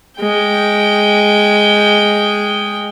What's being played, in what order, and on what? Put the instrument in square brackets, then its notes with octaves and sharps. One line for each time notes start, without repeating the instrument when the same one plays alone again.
[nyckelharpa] G#3 G5